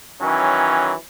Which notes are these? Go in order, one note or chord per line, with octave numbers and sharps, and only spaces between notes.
D#3 E3 F#3 C#4